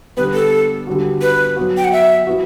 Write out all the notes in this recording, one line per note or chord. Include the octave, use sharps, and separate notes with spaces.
D3 G3 B3 B4
A4
D3 G3 B3 F#4
B4
F#3 B3 F#4
G5
F#5
E5
E3 B3 F#4